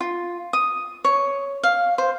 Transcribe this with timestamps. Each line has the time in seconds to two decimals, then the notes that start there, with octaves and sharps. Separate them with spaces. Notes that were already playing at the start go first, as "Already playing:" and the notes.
0.01 F4
0.53 D#6
1.05 C#5
1.63 F5
1.98 C5